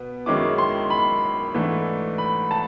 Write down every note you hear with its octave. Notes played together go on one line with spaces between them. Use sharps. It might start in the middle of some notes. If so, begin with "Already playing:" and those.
Already playing: B2 B3
F#2 D#3 G#3 C#4 E4 D6
C6
B5
G#2 E3 A3 D4
B5
A5